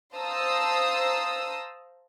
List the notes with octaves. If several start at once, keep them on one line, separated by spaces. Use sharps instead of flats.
C5 F5 A5 A#5 D#6 E6